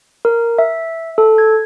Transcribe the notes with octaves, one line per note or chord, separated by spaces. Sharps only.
A#4
E5
A4
G#6